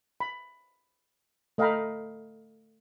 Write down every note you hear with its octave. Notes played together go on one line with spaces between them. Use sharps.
B5
A3 D#5 F5 G5 A#5 B5